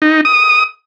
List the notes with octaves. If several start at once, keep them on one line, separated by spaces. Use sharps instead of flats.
D#4
D#6